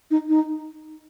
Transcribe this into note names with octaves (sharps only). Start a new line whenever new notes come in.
D#4
D#4